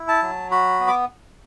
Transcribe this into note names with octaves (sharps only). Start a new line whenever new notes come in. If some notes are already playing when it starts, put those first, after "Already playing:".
Already playing: E4
A5
F#3
F#4 B5
B3
D6